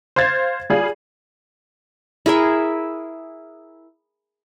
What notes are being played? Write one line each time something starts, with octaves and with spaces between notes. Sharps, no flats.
C5 F5 G#6 A6
G3 F4 G#4 F5
E4 G#4 A#4 E5